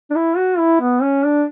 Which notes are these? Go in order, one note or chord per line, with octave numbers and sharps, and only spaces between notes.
D4
E4
F#4
E4
B3
C#4
D4